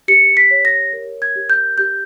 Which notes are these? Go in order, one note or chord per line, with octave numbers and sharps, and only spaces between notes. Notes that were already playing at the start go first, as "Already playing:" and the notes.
G4 C#7
B6
C#5
A#6
A#4
G#6
G4
G6
G4 G6